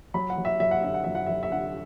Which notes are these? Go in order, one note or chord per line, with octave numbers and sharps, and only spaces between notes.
F#3 B5
F#5
F#3
E5
F#3 E5
F#5
D3 E5
F#5
F#3 E5
F#5
F#3 E5
E5
D3 F#5